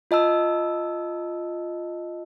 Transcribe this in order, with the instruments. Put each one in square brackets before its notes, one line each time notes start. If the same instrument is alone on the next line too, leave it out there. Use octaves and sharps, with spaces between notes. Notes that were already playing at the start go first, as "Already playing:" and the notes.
[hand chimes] F4 D#5 A5 E6